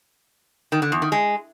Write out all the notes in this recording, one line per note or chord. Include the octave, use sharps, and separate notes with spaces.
D#3
D3
E2
D#3
G#3